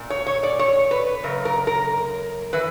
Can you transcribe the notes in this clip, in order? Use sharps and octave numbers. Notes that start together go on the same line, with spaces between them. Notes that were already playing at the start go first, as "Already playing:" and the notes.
Already playing: A#2
C#5
C#5
D5
C#5
B4
F#2 C#3 A#4
A#4
A#4
E3 B4